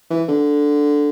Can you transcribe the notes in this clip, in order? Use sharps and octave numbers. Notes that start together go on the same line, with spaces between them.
E3
D3